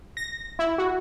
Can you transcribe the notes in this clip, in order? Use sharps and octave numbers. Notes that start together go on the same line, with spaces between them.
A#6
E4
F#4